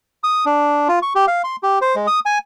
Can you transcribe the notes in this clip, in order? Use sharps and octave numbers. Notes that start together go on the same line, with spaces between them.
D#6
D4
F4
C#6
G4
F5
C6
G4
C5
G#3
D#6
G#5